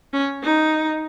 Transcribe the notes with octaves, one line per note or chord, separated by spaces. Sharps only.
C#4
D#4